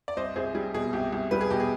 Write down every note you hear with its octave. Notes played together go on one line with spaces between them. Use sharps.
D5
C2 C5 D#5
C2 G#4 C5
G3 G#4
B2 G#4
C2 G4
C2
G3 B4
G#4
B2 G4
G#4